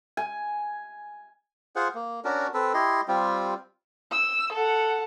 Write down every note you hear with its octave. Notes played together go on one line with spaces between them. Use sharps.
G#5
F4 G#4 C5 F#5
A#3
C#4 D4 F#4 A#4
C4 A4 B4
E4 G4 D#5 C6
G3 C4 F4 G4
E6
A4 F#5